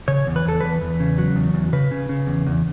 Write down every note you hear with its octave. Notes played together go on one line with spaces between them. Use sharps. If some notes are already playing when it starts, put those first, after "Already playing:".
C#3 C#5
E2
B4
E2 A4
E2 B4
E2
C#3
F#3
E2
E2
C#3 B4
C#3
C#3
E2
E2